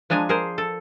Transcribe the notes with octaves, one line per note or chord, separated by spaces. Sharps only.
F3 G#3 D4 G#5 A#5
G#4 A#4 C5
A4